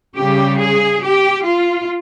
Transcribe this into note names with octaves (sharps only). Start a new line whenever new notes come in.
C#3 G3 G4
G#4
G4
F4